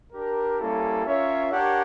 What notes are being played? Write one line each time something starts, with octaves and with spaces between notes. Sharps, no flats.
D4 G4 A#4
G3 A#3 C#4 E4 A4
C#4 F4 A#4 C#5 E5
D4 G4 A#4 C#5 F#5